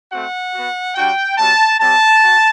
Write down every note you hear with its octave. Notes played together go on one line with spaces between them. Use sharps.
A3 C4 F#4 F#5
B3 F#4
G3 D4 F#4 G5
G3 C4 F#4 A5
G3 C4 G4 A5
F#4